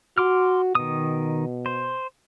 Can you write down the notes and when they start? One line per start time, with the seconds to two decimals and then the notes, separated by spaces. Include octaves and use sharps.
0.18 F#4 C6 D6 F6
0.75 B2 D#3 D#6
1.66 C5